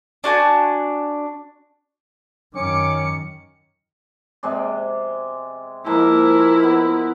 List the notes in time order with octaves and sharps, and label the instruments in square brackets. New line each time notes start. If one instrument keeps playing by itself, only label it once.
[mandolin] D4 F#4 G#5 A5
[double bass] F#2 D#3 [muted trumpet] C#4 [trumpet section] D6 [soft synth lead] C#7
[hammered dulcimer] C3 G#3 D5
[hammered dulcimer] F3 G#3 A#3 [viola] E4 A#4
[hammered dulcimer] B3